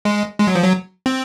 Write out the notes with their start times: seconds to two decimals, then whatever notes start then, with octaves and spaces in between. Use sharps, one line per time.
0.05 G#3
0.39 G#3
0.47 F#3
0.55 F3
0.64 F#3
1.06 C4